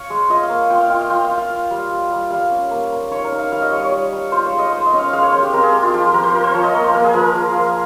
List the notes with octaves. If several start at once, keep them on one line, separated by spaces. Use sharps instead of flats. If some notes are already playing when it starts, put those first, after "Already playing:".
Already playing: C#5 F5
G#3
F4 D#5
F5
A#3
F4 G5
F5
F4 G5
F5
F4 G5
F5
F4
F5
F4
G3
G3
G3
G3 F5
C#4
A#3
A#3
D#4 C#5
A#4
D#4
F5
G3 F5
D#5
G3 C#5
C#5
G3
G3
F4 C5
C#5
G#3
D#5
G#3 C5
D#5
C#4
F5
G#3 F5
C#5
G#3 C5
G4
C4 A#4
G#4
G#3 G4
F4
F3 G4
F3 A#4
C5
F4 A#4
C5
F3 C#5
D#5
A#3 C#5
C5
A#3 A#4
G#4
F3 A#4
F3
F4